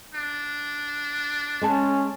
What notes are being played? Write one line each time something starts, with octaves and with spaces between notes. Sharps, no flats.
D4
G#3 C#4 G#4 A5